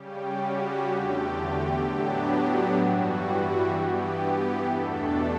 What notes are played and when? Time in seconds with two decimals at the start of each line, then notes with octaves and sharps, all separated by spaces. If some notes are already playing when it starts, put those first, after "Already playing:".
Already playing: C#3 G3 C#4 G4
0.36 F#4
0.83 E2 D3 A3 G4
1.79 A2 F#3 B3 D4
2.74 G2 E3 G3 F#4
3.69 G2 E3 B3 G4
4.64 E2 B2 A3 D4 A4